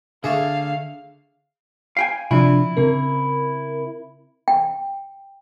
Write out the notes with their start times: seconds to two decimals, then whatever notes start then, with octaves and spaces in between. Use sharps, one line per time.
0.24 D3 A3 D4 G#4 E5 F5
1.97 F5 G5 G#5
2.31 C3 F3 D4 E4
2.77 C#3 C4 A#4
4.48 G5